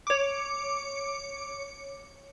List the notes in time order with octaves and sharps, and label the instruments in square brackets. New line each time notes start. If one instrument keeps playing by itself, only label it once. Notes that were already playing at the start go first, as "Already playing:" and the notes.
[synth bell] C#5 D6